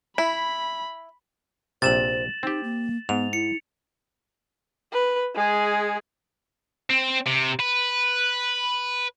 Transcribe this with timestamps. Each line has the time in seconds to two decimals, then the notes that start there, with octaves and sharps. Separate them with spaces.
0.18 E4 B5
1.82 A#1 C3 C5 A6 E7 F#7
2.43 C4 D#4 G4
2.63 A#3
3.09 G#2 B3 F7
3.33 E4 C#7
4.93 B4
5.35 G#3 G#4
6.90 C4
7.27 C3
7.60 B4